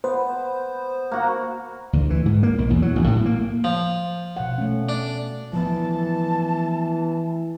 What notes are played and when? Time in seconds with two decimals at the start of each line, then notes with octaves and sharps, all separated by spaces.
0.04 B3 C5
1.11 A#3 F#4 F#5
1.93 D2
2.10 E3
2.26 G#2
2.43 A#3
2.58 B1
2.70 E2
2.82 F#3
2.96 A1
3.07 A2
3.26 A#3
3.64 F3
4.37 B2 F#5
4.58 A3 C#4
4.89 D4
5.53 E3 F3 A3 B3 A5